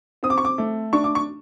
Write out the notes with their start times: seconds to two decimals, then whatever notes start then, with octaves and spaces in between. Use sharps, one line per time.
0.23 C4 D#6
0.30 D6
0.38 C#6
0.45 D6
0.58 A3
0.93 D4 C#6
1.04 D6
1.15 C#6